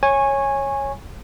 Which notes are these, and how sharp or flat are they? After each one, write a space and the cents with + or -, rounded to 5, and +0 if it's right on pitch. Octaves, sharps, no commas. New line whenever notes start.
C#5 -10 G#5 -10 C#6 -20